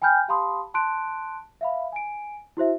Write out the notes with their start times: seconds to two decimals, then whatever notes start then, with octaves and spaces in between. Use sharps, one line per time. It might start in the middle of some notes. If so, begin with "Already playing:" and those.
0.02 G5 G#5 B5 F6 G6
0.28 G4 F5 A5 B5 C6 D#6
0.74 A5 C6 F#6 D7
1.61 E5 F5 B5
1.92 G#5 D7
2.57 E4 F#4 C5 E5